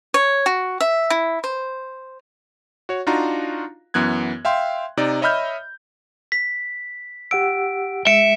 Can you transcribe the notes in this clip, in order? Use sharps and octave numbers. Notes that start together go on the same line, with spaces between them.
C#5
F#4
E5
E4
C5
F#4 C#5
D4 D#4 F4 F#4 F5 A#5
F#2 E3 B3 F#6 G#6
E5 F5 G5 C6
C3 D#4 D5
C#5 D#5 E5 B5 F6 G6
B6
G4 F#5 E6 D7
G#3 E5 C#7 D7 E7